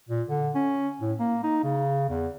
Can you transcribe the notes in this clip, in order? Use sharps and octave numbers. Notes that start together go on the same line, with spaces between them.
A#2
D3
C#4
A2
A#3
D#4
C#3
E2